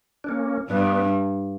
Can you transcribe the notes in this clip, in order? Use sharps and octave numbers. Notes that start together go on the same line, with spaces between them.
D4
A#3 C#4
G2 B3 D4